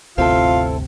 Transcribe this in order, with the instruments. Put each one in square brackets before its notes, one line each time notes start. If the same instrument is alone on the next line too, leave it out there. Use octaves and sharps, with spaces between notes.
[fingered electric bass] G1 D2 C3 [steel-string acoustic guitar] C4 E4 A4 [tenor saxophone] F4 [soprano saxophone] F5